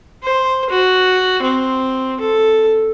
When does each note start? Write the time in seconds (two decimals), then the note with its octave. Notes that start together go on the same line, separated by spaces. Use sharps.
0.23 C5
0.70 F#4
1.42 C4
2.20 A4